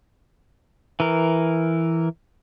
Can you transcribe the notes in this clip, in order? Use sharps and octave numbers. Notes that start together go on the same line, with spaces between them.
E3 A#4